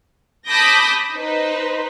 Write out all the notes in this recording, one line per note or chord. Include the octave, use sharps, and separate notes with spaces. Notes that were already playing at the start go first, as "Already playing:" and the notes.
A5 B5 D6 D#6 G6 A#6
D#4 B4 C5